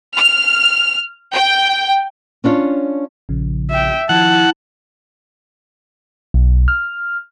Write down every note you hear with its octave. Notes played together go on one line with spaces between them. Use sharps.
F6
G5
C#4 D4 F4 C#5
A#1 C#3 F3
E5 G5
D#3 F3 E4 F#5 A5 G#6
B1
F6